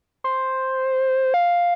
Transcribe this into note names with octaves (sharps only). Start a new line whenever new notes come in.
C5
F5